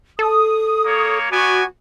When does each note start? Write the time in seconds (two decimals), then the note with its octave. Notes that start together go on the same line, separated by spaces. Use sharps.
0.19 A4 D#6
0.85 A#3 C#5
1.31 B3 F#4 D5 G#5